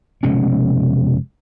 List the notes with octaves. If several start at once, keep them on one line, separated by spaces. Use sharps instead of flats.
F1 B2 G#3 C#4